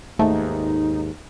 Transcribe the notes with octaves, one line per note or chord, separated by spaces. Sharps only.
D#2 G#2 A3 D#4